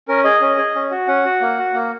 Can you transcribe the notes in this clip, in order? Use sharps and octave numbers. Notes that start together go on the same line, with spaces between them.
C#4 A#4
G#4 D#5
C#4
G#4
C#4
F#4
C#4 F#5
F#4
A#3
F#4
A#3